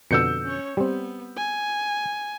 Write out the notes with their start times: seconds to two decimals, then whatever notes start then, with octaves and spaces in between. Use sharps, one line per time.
0.11 F2 B2 D3 E6 G6 C#7
0.44 C#4 C#5
0.77 G3 B3 C4
1.37 G#5